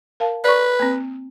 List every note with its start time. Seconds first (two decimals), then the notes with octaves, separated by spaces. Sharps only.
0.20 A#4 F5 A5
0.44 B4 D5 C#6
0.79 A#3 C4